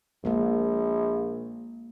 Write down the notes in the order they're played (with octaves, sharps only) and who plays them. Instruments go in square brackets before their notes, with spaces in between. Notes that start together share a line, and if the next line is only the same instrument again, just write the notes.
[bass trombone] A#1 [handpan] G#3 A#3